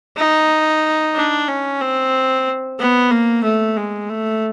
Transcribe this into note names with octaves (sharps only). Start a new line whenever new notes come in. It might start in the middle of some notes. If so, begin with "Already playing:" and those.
D#4
D4
C#4
C4
B3
A#3
A3
G#3
A3